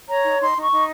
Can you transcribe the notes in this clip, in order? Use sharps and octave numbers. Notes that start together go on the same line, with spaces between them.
C#5 A#5
D#4
D#4 C6
D#4 C#6
D#4